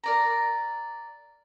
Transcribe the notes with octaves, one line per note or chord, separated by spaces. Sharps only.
A#4 D5 A#5